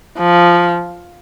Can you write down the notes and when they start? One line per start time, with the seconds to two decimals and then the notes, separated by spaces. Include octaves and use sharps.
0.18 F3